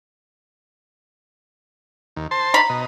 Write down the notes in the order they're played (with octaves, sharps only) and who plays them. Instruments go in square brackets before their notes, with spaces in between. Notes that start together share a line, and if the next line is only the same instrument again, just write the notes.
[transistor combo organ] D#2
C5 A5 C6
[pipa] A#5 B5
[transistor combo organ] B2 D#5